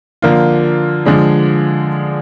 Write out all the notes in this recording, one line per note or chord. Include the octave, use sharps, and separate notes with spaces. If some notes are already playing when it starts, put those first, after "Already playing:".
D3 F3 A#3 F4
D3 F3 G#3 D4